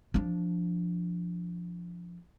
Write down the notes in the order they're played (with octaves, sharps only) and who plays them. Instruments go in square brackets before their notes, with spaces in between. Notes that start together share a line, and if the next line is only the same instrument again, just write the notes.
[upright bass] F3 D4